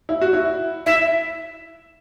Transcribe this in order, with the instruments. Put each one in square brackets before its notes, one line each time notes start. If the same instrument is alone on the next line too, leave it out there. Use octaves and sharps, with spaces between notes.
[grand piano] E4
F#4
E4
[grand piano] E4 [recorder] E5